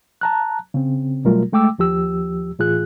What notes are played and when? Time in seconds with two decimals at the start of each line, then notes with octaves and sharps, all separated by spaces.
0.21 A5 A#5 F#6
0.74 C#3 C4
1.25 B2 F#3 G3 A3 F4 A#4
1.53 G#3 A3 G5 D6 E6
1.79 D#2 F3 G4 E6
2.59 A2 E3 F4 G#4 F#6